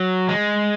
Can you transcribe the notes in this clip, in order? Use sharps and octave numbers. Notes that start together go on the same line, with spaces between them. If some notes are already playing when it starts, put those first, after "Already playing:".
Already playing: F#3
G#3